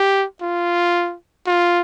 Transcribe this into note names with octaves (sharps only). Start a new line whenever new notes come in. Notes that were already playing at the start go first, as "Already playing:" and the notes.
Already playing: G4
F4
F4